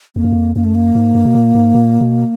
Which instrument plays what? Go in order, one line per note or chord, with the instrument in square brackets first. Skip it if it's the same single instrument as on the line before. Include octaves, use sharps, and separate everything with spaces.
[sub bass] F2 [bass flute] A#3
[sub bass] F#2
F2
[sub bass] F#2 [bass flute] A#3
[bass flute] A3
A#3
[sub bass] G#2
G2
B2
A#2
G#2
A#2
B2